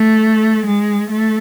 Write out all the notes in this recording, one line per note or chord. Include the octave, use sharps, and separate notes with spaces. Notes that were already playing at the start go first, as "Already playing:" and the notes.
Already playing: A3
G#3
A3